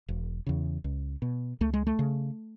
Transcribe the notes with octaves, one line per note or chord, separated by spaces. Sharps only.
E1
E2 C#3
C#2
B2
C#2 A3
G#3
A3
C#3